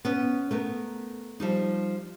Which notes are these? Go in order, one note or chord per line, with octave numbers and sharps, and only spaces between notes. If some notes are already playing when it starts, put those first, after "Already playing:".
B3 C#4
A3 B3 A#4
F3 G3 D#4